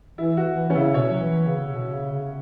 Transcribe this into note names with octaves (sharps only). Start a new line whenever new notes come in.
E3 E4
F#4
E3
E3 C#4
C#3 E4
B2 C#5
F#3
E3
C#3
C#3
B2
C#3
C#3